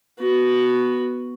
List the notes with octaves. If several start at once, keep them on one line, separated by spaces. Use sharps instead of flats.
B3 F#4